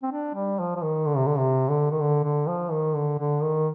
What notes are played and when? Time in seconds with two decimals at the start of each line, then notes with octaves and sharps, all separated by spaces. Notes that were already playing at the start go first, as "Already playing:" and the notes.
0.03 C4
0.12 D4
0.35 G3
0.59 F3
0.76 F3
0.82 D#3
1.06 D3
1.16 C3
1.26 D3
1.38 C3
1.68 D3
1.91 D#3
2.00 D3
2.24 D3
2.47 F3
2.71 D#3
2.95 D3
3.19 D3
3.43 D#3